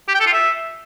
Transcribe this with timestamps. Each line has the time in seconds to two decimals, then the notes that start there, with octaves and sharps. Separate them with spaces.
0.08 G4
0.14 G5
0.20 A4
0.26 F4
0.33 E5